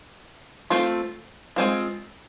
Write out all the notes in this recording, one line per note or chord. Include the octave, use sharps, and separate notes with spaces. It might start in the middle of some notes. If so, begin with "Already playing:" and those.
A3 C4 F4
G#3 C4 F4